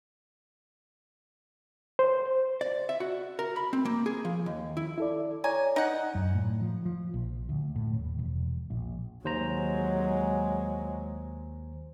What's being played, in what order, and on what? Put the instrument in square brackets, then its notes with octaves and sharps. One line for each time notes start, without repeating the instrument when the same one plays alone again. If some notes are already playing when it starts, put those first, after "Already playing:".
[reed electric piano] C5
[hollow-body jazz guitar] D5
E5
F#4
A#4
B5
C4
A#3
G#4
F3
D#2
E4
[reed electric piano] E4 A4 D5
[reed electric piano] C#5 D5 A#5 [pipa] G#5
[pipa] D#4 F#5
[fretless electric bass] F#2
A2
F3
F3
A#1
D2
A2
D#1
E1
A#1
[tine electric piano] D#2 C5 A#5 [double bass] F#3 G#3